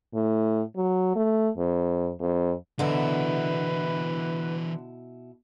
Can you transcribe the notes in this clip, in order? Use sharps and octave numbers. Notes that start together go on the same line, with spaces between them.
A2
F#3
A3
F2
F2
B2 D3 E3 E4 A#4 B4